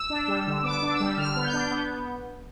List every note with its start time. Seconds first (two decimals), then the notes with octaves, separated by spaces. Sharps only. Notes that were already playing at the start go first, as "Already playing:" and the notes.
Already playing: E6
0.10 D4
0.28 G3
0.47 D3
0.63 B3 D6
0.82 D4
0.91 E6
1.00 G3
1.17 D3 F6
1.36 B3
1.45 G6
1.53 D4
1.71 B3